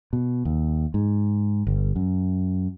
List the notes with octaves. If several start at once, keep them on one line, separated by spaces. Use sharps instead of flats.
B2
D#2
G#2
G1
F#2